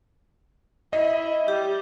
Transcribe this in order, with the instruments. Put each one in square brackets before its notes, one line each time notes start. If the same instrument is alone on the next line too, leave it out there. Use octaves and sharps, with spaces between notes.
[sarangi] E4 [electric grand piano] D#5
[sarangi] G3 [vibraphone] G4